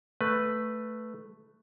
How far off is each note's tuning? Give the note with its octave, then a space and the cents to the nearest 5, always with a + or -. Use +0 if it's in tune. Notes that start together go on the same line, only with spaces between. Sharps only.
A3 +5 B4 +0